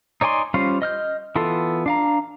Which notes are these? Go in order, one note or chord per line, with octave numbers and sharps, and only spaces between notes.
D#4 C#5 D5 G#5 C6
G3 C#4 F4 C5 F5
D#5 F6 G6
E3 B3 F4 A4
D4 F5 A#5